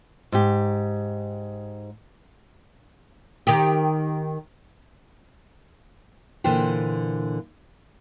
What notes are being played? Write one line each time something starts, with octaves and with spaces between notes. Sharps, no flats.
G#2 G4
D#3 G4
A#2 D3 E3 C5 G5